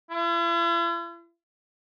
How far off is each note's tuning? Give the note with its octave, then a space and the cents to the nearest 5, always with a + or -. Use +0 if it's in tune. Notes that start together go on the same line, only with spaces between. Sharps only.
E4 +45